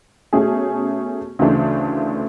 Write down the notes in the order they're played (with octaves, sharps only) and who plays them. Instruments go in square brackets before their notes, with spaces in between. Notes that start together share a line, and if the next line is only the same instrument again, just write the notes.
[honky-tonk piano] B2 A3 C#4 G#4
D2 C#3 E3 A3 D4